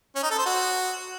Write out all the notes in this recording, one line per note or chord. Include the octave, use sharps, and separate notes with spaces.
C#4
D#4
A4
C5
F#4